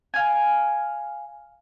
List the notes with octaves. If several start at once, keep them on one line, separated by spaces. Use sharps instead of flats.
F5 G#5